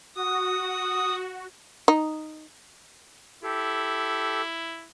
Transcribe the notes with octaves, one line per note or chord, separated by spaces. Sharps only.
F#4 D#6
D#4
E4 G4 A4